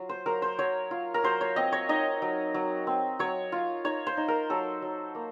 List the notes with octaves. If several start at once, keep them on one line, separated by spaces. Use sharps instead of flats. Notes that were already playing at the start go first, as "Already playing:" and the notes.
Already playing: F#3 F4
C5
F#3 A#4
C5
F#3 C#5
F4
A#4
F#3 C5
C#5
C4 D#5
C#5
D#4 D#5
F#3
F#3
C4
F#3 C#5
F4
D#4 C#5
C5
D#4
A#4
F#3 A4
F#3
A#3